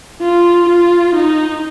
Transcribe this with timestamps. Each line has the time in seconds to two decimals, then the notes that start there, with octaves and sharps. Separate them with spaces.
0.22 F4
0.69 F4
1.15 D#4